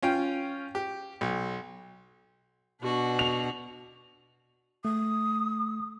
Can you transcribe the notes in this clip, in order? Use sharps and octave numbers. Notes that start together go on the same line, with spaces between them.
C#4 F4 G5
G4
B1
B2 D4 F#4
F7
A3 D#6